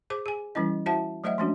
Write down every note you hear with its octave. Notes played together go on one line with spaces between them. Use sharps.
G#4 C5 D6
G#4 G#5
E3 G3 C#4 E4 D#5
E4 F#4 C5 E5 F#5 A5
F#3 A3 C5 D#5 E5 F#5
F3 G#3 A3 C#4 D4 F#4